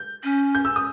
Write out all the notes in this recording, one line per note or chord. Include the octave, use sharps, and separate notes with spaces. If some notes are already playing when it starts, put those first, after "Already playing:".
Already playing: G6
C#4
G6
E6
D#6